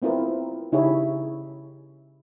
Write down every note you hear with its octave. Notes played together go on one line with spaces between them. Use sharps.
B3 C4 E4 F4 A#4 B4
C#3 D#4 E4 G4 G#4 C#5